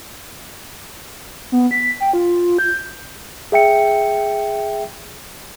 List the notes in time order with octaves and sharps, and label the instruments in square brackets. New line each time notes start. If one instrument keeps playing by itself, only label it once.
[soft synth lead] B3
B6
G5
F4
G6
[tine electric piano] G#4 E5 G5 C#7